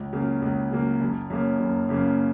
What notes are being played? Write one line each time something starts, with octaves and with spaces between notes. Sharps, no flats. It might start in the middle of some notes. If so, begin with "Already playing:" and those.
Already playing: C#2
C#3 F#3 A#3
C#2
C#3 F#3 A#3
F#1
F#2 C#3 A#3
F#1
F#2 C#3 A#3